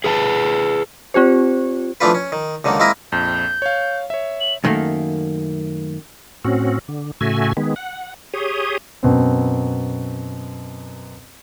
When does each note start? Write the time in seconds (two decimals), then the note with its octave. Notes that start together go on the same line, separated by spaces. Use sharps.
0.04 G#4 B4 G5 A5
1.14 C4 F4 G4 C5
2.01 E3 F3 A3 D4 F4 B4
2.15 C#4
2.32 D#3
2.64 C#2 D3 D#3 A#3
2.80 G#3 A#3 C4 E4 A#4 D#5
3.12 A#1 F2 G6
3.62 C#5 F5
4.10 C#5 E5
4.41 F#7
4.64 F#2 D#3 A3 A#3
6.45 A2 C4 C#4 F#4
6.88 D3
7.21 A2 C#3 A3 F#4 E5 G#5
7.57 D#3 G#3 B3
7.76 F#5
8.34 G4 G#4 C#5 D#6
9.03 F#2 B2 C4